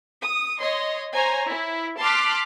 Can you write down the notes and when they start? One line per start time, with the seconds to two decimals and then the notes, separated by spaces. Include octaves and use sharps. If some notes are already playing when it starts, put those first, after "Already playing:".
0.21 D#6
0.61 C#5 D#5 C6
1.12 C5 C#5 G#5 A#5
1.49 E4
2.00 A5 C6 D6 F6 F#6 B6